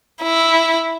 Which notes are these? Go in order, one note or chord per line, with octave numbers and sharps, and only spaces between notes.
E4